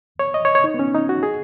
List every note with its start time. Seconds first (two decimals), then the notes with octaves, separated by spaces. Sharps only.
0.19 C#5
0.34 D#5
0.45 C#5
0.55 C#5
0.64 D#4
0.74 B3
0.79 C#4
0.94 D#4
1.09 F#4
1.23 G#4